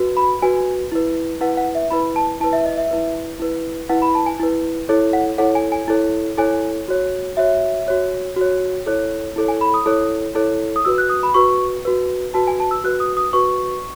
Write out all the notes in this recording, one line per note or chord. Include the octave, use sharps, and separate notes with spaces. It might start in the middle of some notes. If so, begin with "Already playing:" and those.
Already playing: F#4 B4
B5
F#4 B4 G#5
E4 B4
E4 B4 F#5
F#5
E5
E4 B4 B5
A5
E4 B4 A5
E5
D#5
E5
E4 B4
E4 B4
E4 B4 F#5
B5
A5
G#5
E4 B4
E4 A4 C#5
F#5
E4 A4 C#5 F#5
G#5
G#5
E4 A4 C#5
E4 A4 C#5 G#5
F#4 C#5
F#4 C#5 E5
F#4 C#5
F#4 C#5
E4 A4 C#5
E4 A4 C#5
G#5
B5
D#6
E4 A4 C#5
E4 A4 C#5
D#6
F#4 B4 E6
F#6
D#6
B5
F#4 B4 C#6
F#4 B4
F#4 B4 A5
G#5
A5
E6
F#4 B4 F#6
D#6
D#6
F#4 B4 C#6